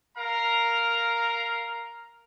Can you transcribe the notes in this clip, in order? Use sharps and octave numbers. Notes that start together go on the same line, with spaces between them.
A#4 F5 A#5